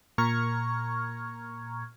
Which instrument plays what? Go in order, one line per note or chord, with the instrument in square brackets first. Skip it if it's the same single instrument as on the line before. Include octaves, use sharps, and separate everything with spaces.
[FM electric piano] A#2 A#5 C#6 F6 G#6